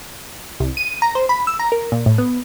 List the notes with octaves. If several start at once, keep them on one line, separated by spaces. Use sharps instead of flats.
C2
D#7
A#5
C5
B5
E6
A#5
A#4
A#2
A2
B3